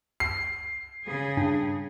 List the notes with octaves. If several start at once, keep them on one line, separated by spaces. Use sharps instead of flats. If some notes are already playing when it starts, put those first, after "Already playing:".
C7
C#3 G#4
G2